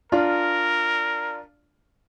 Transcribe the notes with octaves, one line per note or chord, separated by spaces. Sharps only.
D4 F4 A#4